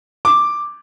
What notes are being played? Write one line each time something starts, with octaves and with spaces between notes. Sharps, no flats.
D6